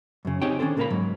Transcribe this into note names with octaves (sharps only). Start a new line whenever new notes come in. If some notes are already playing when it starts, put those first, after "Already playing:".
F#2 C#3
C4 D#4 G4 G#4 C#5 G5
D#3 C#4 D4 G#4 A4 C5
C#2 A#2 A#3 A#4 F5 B5
G#2 F#3